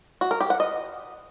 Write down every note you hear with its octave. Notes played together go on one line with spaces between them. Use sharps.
F#4
A#4
G4
F#5
D#5